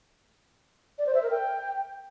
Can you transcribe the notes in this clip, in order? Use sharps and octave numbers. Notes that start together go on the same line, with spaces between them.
D5
C5
E5
A#4
G5